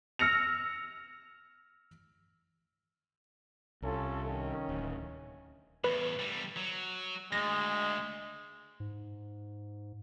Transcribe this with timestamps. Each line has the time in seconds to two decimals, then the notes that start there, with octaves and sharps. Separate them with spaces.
0.19 E6 F6 A#6 C#7 F7
3.82 C2 C#4 F4 A4
4.26 D#3 C#4
4.69 D1
5.84 E2 A2 B4
6.19 D3 G3
6.56 F#3
7.32 D2 G2 G#3 A#6
8.80 G#2